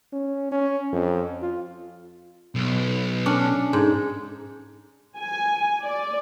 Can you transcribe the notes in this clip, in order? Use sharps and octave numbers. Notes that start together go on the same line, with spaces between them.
C#4
C#4
F2
F4
B1
C#4 D4
G#2
G#5
D5